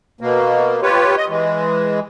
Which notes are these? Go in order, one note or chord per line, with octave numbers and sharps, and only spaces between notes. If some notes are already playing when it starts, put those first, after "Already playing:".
B2 A#3
F4 G4 B4 C#5
D#5
E3 G#3